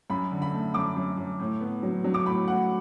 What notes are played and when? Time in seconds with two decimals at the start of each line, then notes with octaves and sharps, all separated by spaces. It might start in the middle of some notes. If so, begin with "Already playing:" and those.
0.10 F#2 B5
0.31 D3
0.42 B5
0.53 A3
0.74 F#2 D6
0.96 F#2
1.17 F#2
1.40 A2
1.61 B3
1.83 F#3
2.04 F#3
2.14 D6
2.26 A2 B5
2.48 A2 F#5